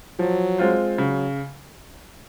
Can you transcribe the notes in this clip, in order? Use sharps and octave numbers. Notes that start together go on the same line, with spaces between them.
F3 F#3
G#3 C4 F4 C5
C#3 F#3